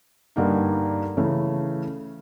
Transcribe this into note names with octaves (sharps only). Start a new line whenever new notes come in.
G2 D3 G3 A#3 D#4
C#3 E3 A3